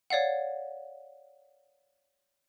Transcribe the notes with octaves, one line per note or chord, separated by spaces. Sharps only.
C#5 D5 F5 F#5